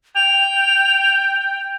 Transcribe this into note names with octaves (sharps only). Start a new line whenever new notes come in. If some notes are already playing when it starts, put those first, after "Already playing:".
G5 F7